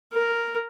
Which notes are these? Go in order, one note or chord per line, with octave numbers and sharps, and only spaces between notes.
A#4